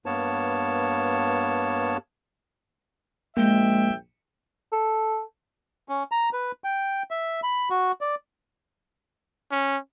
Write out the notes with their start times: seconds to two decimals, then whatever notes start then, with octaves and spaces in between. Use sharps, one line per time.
0.06 G2 A#3 B3 C#5 A5
3.37 A#1 G#3 A#3 E5 G5
4.72 A4
5.89 C#4
6.12 A#5
6.33 B4
6.64 G5
7.11 E5
7.43 B5
7.70 F#4
8.01 D5
9.52 C#4